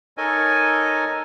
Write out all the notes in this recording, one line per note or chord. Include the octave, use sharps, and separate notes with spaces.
D#4 A4 A#4 C#5 D#5 G#5